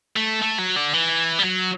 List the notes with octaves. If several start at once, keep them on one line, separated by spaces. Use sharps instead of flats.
A3
A3
F#3
D3
E3
G3
F#3